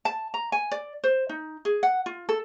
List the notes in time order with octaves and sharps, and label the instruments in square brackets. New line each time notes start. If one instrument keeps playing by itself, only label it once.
[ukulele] A5
A#5
G#5
D5
C5
D#4
G#4
F#5
F4
A4